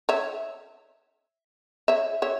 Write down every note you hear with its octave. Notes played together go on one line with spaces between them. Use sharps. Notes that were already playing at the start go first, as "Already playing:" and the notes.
C#5 E5
C#5 E5
C#5 E5